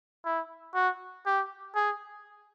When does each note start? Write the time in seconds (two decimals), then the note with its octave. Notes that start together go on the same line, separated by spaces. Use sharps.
0.25 E4
0.74 F#4
1.26 G4
1.75 G#4